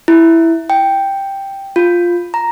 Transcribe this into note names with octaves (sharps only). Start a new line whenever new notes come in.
E4
G5
F4
A#5